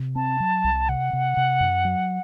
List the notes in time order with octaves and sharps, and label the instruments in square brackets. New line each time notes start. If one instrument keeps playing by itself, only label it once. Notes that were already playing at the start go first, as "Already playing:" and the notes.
Already playing: [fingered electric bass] C3
[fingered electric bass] C4 [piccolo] A5
[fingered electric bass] F#3
C2
[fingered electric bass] C3 [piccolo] F#5
[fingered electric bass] C3
C3
F#2
F#3